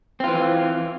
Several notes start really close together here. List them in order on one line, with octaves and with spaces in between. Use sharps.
C4 F4 E3